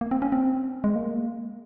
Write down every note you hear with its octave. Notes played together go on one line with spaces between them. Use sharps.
A#3
C4
C#4
C4
G#3
A#3